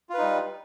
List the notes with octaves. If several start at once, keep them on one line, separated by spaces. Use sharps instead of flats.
G3 D#4 F4 B4